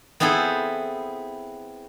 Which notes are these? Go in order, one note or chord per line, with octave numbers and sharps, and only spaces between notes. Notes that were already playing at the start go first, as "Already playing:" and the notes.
B3 C4 E4 G#4 A4